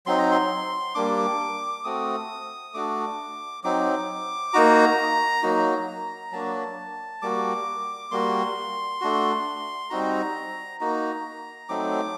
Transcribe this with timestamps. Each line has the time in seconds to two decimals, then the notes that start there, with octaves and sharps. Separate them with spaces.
0.06 F#3 C4 D#4 C6
0.18 A#5
0.31 C6
0.95 G3 A#3 D4 D6
1.84 A3 C4 F#4 D#6
2.74 A3 D4 F#4 D6
3.64 F#3 C4 D#4 D6
4.53 A#3 D#4 F#4 A#5
5.43 F#3 A#3 D#4 F#4
6.32 F#3 A#3 D4 F#4 A5
7.22 G3 A#3 F#4 D6
8.11 G3 A#3 F#4 C6
9.01 A3 D4 F#4
9.90 G3 C4 D#4 F#4 A#5
10.80 A#3 D#4 F#4 A#5
11.69 F#3 A3 C4 D#4 D6